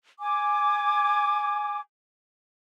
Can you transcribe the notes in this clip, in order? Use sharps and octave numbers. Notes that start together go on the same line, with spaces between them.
G#5 D6